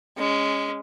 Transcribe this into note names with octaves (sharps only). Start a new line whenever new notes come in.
G#3 C#4